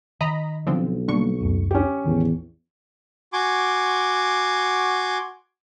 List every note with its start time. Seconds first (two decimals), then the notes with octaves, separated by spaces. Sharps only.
0.21 D#3 D#5 A#5 B5
0.67 B1 D3 F3 C4
1.08 D3 G3 A#3 C#6
1.41 C#2 F#2 A3
1.71 C#4 G4
2.05 A1 E2 D#3
3.33 F#4 G#5 C6 D6